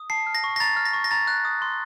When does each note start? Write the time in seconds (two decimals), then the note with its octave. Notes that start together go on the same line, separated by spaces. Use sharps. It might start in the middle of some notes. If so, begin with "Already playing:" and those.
Already playing: D#6
0.10 A5 C7
0.27 F6
0.35 A#6
0.44 C#6
0.56 A#6
0.60 A#5 A6
0.76 F6
0.85 A#6
0.93 C#6
1.04 A#6
1.11 A#5 A6
1.27 F#6
1.45 D#6
1.62 C6